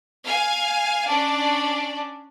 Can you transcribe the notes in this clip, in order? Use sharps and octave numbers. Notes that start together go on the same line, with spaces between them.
F5 G#5
C#4 D4 D5